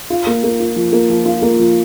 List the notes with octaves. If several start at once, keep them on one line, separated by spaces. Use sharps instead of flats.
F4
A#3
A#3
F4
F3
A#3
F3
F4
A#3
F3